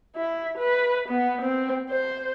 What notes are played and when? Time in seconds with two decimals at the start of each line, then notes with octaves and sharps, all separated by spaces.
0.16 E4
0.58 B4
1.09 B3
1.42 C4
1.90 C5